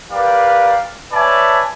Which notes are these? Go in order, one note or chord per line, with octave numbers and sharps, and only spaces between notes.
G4 A#4 B4 D5 F5
B4 C#5 D5 E5 G#5 A5